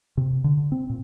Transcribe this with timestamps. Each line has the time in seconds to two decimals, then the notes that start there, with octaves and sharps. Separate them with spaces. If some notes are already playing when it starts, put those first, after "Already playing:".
0.17 C3
0.44 D3
0.72 C4
0.90 A#2